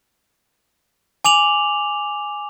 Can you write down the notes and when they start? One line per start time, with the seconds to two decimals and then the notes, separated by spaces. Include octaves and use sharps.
1.25 G#5 D6 F7 F#7